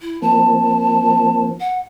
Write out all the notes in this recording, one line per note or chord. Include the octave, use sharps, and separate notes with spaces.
E4
F3 A#3 C4 A5
F#5